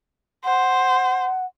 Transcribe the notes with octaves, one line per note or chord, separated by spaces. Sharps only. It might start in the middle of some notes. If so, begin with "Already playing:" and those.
C5 F#5